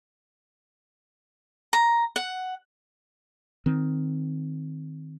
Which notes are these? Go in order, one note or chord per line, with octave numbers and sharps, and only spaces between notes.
A#5
F#5
D#3 C4